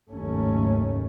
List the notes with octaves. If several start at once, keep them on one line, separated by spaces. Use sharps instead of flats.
F#1 D#2 G#2 A3 C#4